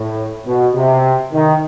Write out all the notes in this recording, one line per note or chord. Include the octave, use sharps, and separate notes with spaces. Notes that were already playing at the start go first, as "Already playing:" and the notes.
Already playing: A2
B2
C3
D#3